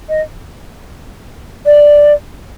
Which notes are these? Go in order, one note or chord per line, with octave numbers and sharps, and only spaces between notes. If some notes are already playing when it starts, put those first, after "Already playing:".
D#5
D5